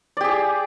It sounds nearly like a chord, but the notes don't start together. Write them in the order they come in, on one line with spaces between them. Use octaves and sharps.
D5 G4 G#4